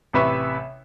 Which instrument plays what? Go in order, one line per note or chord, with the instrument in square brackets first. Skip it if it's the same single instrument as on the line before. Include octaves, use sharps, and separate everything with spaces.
[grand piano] A1 C3 B4 E5 C#6